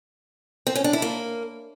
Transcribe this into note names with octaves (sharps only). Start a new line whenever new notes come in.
C4
C#4
D4
E4
A#3